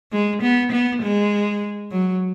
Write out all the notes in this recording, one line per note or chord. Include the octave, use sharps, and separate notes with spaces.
G#3
B3
B3
G#3
F#3